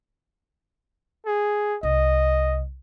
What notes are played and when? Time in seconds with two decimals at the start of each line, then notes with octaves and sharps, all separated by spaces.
1.26 G#4
1.83 C2 D#5